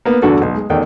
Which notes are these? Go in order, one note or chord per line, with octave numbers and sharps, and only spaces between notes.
A#3 B3
E2 G2 D3 F#4 A4
B1
G#3
A1 E2 D#3 A4 G5